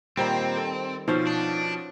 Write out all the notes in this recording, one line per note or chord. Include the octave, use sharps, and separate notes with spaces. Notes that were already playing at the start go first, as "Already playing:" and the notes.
A#2 D#3 G3 C4 C5 A#5
A4
B2 F3 C#4 D#4 C5 F5
D4